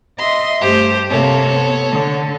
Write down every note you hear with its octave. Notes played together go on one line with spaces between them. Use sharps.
D#5 E5 C6
G2 A3 G4 C5
C3 A#3 A4 C#5
B3
D3